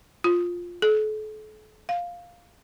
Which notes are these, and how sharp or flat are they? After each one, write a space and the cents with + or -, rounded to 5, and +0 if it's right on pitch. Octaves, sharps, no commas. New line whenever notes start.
F4 +5
A4 -40
F5 +5